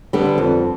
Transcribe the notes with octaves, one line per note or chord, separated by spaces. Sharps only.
D3 G3 B3
F2